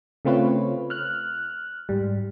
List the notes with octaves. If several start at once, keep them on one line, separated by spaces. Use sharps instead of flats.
C#3 A3 C4 F4 B4 C#5
F6 F#6
G#2 G3